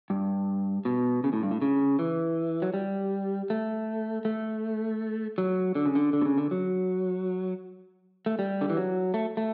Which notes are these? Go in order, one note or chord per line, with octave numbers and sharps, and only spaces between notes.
G2
B2
C#3
A2
G2
A2
C#3
E3
F#3
G3
A3
A3
F#3
D3
C#3
D3
D3
B2
C#3
D3
F#3
A3
G3
D3
E3
F#3
A3
A3